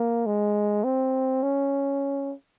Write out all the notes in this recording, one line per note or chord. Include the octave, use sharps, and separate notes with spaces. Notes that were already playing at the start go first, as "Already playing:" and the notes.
Already playing: A#3
G#3
C4
C#4